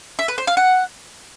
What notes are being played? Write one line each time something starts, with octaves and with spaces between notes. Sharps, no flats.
E5
B4
C5
F5
F#5